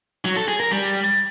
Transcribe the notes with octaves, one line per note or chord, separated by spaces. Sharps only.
F#3
A4
G#4
A#4
G3